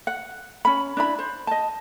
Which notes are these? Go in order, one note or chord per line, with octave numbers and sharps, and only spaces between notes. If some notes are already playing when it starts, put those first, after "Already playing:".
F#5
C#4 B5
D4 E4 B5
C5
D#5 A5